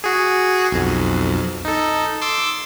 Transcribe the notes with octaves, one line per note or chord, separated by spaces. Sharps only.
F#4 G#4
B1 F2
D#4 A4
C6 D6 E6